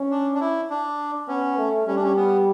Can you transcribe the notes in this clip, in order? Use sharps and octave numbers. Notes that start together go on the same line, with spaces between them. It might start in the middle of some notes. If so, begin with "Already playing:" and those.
Already playing: C#4
D4
D4
E4
D4
B3 C#4
A3
G3 C#4
D4
C#4
B3